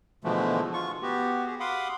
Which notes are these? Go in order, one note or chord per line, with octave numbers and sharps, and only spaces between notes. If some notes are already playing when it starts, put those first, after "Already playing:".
B2 D3 E3 F3 G#3 A3
F4 C#6
B3 F#4 G4
G4 G#4
F5 F#5 B5 C6 D6 D#6